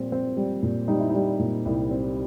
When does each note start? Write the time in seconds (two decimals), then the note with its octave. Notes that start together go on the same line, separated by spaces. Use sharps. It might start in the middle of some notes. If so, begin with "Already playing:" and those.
Already playing: A#2 G3 C4
0.12 C4
0.37 G3
0.63 A#2
0.88 G3 D#4
1.00 E4
1.10 G3 D#4
1.39 A#2
1.65 C2
1.91 C4